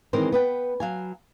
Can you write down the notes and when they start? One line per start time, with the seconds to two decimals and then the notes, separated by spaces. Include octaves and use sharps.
0.13 D#3 E3 G#3 C4 A#4 C5
0.32 B3 B4 G5
0.80 F#3 F5 G#5